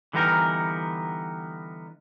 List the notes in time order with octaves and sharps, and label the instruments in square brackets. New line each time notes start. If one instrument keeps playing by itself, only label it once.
[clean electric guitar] D3 E3 G3 B3 D#4 A#4